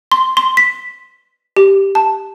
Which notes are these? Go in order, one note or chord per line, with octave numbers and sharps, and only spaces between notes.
C6
C6
B6
G4
A5